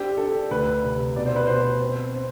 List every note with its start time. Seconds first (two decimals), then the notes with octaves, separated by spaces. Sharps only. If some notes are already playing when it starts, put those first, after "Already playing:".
Already playing: C4 D4 G4
0.17 D4 A4
0.51 D2 B4
0.83 C3
1.16 B2 D5
1.26 C5
1.36 B4
1.46 B2 C5
1.80 C4
2.14 C4